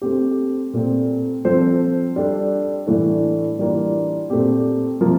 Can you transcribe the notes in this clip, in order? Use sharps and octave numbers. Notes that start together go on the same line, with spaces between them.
A3 C4 G4
A#2 A3 C4
F3 C4 F4 A4 C5
G3 D4 A4
A2 E3 A3 D4
E3 G3 A#3 D4 F4
A#2 A3 C4 G4
C3 F3 A#3 F4